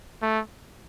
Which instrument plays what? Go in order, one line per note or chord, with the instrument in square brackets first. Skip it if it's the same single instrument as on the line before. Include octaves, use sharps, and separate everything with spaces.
[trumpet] A3